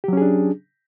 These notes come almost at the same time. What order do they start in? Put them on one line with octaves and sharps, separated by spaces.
G4 F#3 C#4 G#4 D4